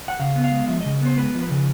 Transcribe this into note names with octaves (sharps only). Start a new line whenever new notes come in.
F#5
C#3 F5
B3
F5
G#3
F3 E5
C#3 D#5
B3 C5
G#3 B4
F3
B4
C#3